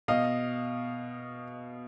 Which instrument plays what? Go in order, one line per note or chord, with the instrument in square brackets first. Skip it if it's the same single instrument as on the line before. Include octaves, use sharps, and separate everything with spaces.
[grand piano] B2 D#5 F5